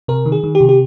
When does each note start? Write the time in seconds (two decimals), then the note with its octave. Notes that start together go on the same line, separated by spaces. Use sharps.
0.08 C3 A#4
0.26 D#3
0.32 G#4
0.44 D#3
0.55 G4
0.61 C3
0.69 G4